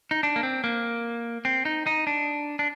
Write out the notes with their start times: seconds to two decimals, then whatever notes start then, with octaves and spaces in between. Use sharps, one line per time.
0.11 D#4
0.23 D4
0.36 A#3
0.43 C4
0.64 A#3
1.45 C4
1.65 D#4
1.87 D#4
2.07 D4
2.59 D4